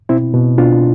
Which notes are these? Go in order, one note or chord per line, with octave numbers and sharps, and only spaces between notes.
B2 C4 E4
B2
B2 D4 F4